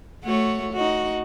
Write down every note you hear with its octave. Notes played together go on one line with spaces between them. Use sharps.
A3 F#4 C#5
D#4 F#4